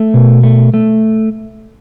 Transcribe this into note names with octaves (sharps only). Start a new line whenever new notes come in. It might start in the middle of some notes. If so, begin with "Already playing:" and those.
Already playing: A3
B2
A3
A3